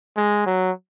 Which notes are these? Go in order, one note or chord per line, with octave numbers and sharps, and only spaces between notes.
G#3
F#3